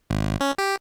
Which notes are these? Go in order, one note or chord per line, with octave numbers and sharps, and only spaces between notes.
G#1
C#4
G4